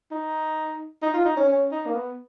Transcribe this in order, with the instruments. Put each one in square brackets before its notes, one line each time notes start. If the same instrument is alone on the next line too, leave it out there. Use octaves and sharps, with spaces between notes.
[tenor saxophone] D#4
D#4
F4
D#4
C#4
C#4
D#4
A#3
B3